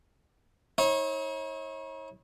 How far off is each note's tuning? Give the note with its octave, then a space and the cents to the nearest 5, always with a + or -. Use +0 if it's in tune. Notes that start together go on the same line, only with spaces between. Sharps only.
D#4 +45 C#5 -30